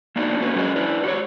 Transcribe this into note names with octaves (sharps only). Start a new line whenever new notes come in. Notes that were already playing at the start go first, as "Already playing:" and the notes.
A#3 B3 D4 D#4 F4 F#4
A3 A#3 C#4 F#4 A#4 B4
F#3 C#4 F#4 G#4 A#4 D#5
D4 E4 B4
F#4 G4 C5 C#5